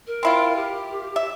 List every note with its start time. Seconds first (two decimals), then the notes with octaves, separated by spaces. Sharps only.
0.07 A#4
0.23 C4 E4 F4
0.56 G4
1.16 E5